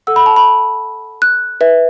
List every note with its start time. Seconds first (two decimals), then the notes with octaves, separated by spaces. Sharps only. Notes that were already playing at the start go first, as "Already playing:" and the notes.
0.07 A4 F#5 E6
0.16 B5
0.26 A5
0.36 B5
1.22 F#6
1.61 B4 E5